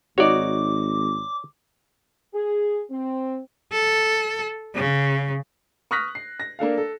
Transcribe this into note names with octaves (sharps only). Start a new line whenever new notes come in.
G#1 D#4 F#4 C#5 D5 D6
G#4
C4
A4
C#3
C#6 D#6 F6 F#6 A#6 B6
C7
A#6
A#3 D4 A4 F5
A4